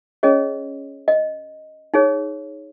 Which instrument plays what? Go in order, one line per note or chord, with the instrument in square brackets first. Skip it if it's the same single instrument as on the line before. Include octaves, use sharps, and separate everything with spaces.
[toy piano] C#4 G#4 C#5 D#5
D#5
D#4 G#4 C#5